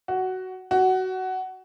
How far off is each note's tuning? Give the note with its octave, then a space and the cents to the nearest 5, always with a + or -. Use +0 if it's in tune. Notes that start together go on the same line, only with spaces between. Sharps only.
F#4 +10
F#4 +15